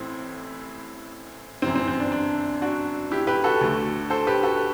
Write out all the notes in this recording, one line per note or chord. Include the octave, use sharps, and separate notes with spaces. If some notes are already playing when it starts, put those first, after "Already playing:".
Already playing: A1 A2 E3 C4 E4
G1 F#2 E3 C4
C4
C4
D4
D4
D4 F#4
E4 G4
G4 B4
F#4 A4
D2 D3 A3
A4 C5
G4 B4
F#4 A4